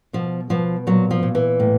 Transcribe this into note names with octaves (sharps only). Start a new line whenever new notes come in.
B2 F3
B2 F3
A#2 F#3
F3
A#2
E3
A2